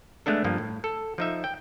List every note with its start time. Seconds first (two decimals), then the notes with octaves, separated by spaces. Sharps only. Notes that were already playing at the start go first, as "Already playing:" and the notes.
0.26 G#3 A3 B3 D4 A4
0.44 G2 F3 A#3
0.58 A2
0.84 A4
1.18 F3 D#4 E5
1.44 G5